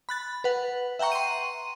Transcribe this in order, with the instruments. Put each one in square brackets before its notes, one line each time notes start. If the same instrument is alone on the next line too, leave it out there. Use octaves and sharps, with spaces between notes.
[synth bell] B5 F#6 A6
B4 F#5
E5 F#5 G5 A#5 C#6
C6 D#7